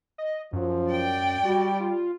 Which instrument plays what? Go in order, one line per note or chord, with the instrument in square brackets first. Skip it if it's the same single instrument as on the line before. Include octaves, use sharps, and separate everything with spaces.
[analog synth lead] D#5
[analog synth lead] F#2 [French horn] F3
[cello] D5 G5
[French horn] G3 [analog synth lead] F#4
[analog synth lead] F4